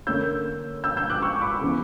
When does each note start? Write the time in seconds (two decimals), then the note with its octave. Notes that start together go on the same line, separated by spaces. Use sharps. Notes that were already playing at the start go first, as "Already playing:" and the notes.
0.07 D3 A#3 C#4 E6 G6
0.84 E6 G6
0.97 E6 G6
1.10 D6 F#6
1.22 C#6 E6
1.41 B5 D6
1.61 C#3 E3 B3